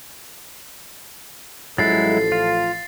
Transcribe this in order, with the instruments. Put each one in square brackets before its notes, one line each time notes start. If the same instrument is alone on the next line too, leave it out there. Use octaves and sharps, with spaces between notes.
[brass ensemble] A1 F3 A4 [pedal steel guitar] F#3 G#3 E4 [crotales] A6 C7
[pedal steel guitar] F4